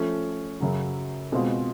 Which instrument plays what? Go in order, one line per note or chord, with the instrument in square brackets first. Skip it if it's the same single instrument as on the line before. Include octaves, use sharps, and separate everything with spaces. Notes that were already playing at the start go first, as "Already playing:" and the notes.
Already playing: [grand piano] F3 A3 C#4
F#2 C#3 F#3
B2 G#3 C4 F4